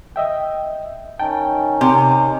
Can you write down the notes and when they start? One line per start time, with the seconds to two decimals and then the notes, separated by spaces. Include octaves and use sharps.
0.16 D#5 E5 G5
1.20 D#3 C#4 D#4 G5 A5
1.81 C3